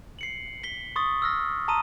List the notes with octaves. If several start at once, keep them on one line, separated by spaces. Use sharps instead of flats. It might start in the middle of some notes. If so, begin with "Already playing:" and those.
C7 C#7 F#7
B6 G7
C6 C#6 D#6 A6
E6 F6 A#6
A5 A#5 C6 D#6 D#7